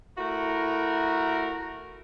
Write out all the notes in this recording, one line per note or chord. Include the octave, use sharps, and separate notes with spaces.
A3 E4 F#4 A#4